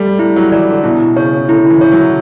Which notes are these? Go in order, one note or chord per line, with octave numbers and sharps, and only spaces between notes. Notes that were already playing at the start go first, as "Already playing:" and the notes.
Already playing: G3 A3
G3 E4
F#3
E3 D5
D3
B2 E4
C#3 C#5
D3 E4
E3
C#5
F#3